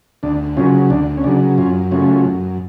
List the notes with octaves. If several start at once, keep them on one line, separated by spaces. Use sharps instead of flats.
D2 D4
C#3 F#3 C#4 F4
D2 D4
C#4
C#3 F#3 D4
F#2 C#4 F4
C#3 F#3 A3 C#4 F4
F#2